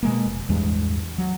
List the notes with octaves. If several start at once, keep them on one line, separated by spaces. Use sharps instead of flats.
B2 G#3 A#3
F1
A1 E2 G2 G#3
F#3